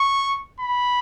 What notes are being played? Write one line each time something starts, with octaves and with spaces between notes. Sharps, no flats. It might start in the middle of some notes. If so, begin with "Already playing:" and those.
Already playing: C#6
B5